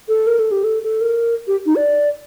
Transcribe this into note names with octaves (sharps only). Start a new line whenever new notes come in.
A4
A#4
A4
G4
A4
A4
A#4
G4
D#4
D5